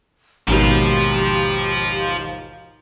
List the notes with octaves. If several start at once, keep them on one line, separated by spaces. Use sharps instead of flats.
A1 D#2 G#2 B2 F3 F4 G4